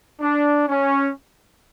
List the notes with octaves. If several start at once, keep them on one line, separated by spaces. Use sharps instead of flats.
D4
C#4